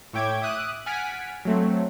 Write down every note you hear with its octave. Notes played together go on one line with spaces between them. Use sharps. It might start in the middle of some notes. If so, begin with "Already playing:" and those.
A2 C#5 E5 G5 D6 G#6
E5 D6 D#6 F#6 D#7
F#5 G#5 F6 A6 B6 D7
F#3 A3 C4